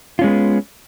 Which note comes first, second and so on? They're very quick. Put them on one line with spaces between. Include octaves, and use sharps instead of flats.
F4 C#4 G#3 B3